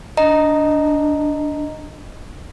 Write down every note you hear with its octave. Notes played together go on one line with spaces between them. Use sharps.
D4 D#5 A#5